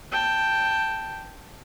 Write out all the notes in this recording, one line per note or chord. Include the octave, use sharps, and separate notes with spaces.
G5 A5